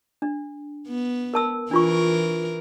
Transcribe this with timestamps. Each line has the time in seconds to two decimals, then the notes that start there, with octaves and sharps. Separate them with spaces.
0.22 D4
0.88 B3
1.34 A#4 A5 E6
1.71 E3 D4 F4 A#4 C#6